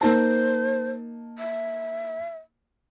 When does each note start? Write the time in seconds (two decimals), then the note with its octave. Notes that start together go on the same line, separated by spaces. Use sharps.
0.01 A#3 D#4 C5 A5
1.38 E5